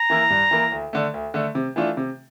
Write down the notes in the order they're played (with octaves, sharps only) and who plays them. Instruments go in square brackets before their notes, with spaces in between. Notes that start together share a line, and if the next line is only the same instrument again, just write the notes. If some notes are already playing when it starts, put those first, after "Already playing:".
Already playing: [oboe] A#5
[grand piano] E3 A#3 E4
G2
E3 A#3 E4
D2
D3 A3
D2
D3 A3
C3
E3 A3 D4 F4
C3